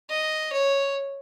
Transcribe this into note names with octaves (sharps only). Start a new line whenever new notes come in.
D#5
C#5